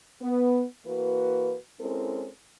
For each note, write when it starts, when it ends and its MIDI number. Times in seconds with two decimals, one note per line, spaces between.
0.22 0.64 59
0.86 1.55 52
0.86 1.55 58
0.86 1.55 66
0.86 1.55 71
1.80 2.29 56
1.80 2.29 60
1.80 2.29 61
1.80 2.29 64
1.80 2.29 69
1.80 2.29 70